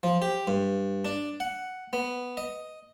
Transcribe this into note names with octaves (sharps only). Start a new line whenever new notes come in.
F3
G4
G2
D4
F#5
B3
D#5